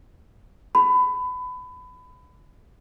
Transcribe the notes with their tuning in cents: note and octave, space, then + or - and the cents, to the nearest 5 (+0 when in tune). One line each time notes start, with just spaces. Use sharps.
B5 +25